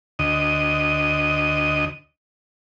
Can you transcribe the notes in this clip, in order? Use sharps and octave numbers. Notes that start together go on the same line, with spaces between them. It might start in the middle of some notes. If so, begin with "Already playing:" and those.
D2 D#5